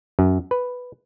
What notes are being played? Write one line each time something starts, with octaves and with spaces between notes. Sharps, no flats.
F#2
B4